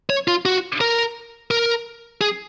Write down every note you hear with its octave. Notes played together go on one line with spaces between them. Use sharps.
C#5
F4
F#4
A#4
A#4
G#4